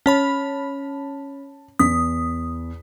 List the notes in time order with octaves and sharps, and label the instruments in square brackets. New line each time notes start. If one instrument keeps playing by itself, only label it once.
[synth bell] C#4 C#5 B5 [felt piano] A5
[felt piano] E2 B6 [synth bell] D#6